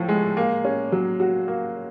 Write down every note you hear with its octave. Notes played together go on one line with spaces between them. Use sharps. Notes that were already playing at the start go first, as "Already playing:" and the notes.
Already playing: A2 F3
G#3
A#3
C#4
F#3
F#4
A#3